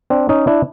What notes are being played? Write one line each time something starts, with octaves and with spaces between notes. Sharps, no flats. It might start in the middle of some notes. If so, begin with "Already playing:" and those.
C4 D4
C#4 D#4
D4 E4